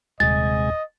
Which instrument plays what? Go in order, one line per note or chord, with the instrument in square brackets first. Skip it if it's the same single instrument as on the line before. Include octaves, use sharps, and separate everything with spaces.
[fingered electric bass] D#1 [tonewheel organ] C3 G#3 G#5 [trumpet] D#5 [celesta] A6